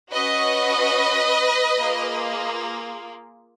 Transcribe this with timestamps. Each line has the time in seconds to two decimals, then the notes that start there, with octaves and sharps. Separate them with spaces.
0.12 C#4 F#4 B4 D#5
1.78 A#3 F4 G#4